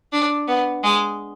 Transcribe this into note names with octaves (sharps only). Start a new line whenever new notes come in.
D4
B3
G#3